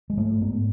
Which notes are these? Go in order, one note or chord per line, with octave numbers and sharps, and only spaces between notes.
G#3
G#2 A3
G#2 B3